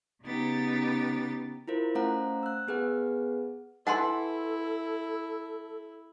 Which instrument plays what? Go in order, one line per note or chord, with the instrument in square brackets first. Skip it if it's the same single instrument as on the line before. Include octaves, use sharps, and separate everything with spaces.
[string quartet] C#3 B3 D#4 G4 A6
[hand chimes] E4 F4 A#4 C5
A3 C#4 C5 F5 F#5 A#5
E6 F#6
B3 G#4 B4 F#5
[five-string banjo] E3 B4 A5 [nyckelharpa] E4 [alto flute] A4 [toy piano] F#5 C6